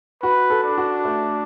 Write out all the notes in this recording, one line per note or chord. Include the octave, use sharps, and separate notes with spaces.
F#4 B4
A4
D4
F#4
A3